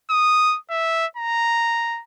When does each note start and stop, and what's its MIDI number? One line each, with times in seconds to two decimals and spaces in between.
0.10 0.57 87
0.70 1.06 76
1.17 2.01 82